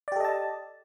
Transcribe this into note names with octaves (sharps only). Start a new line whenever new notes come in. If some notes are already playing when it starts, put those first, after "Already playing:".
G4 A4 D5 D#5 A5